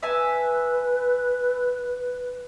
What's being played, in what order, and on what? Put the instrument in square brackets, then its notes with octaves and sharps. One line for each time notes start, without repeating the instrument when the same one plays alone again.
[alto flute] B4 [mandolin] E5 G#5 A5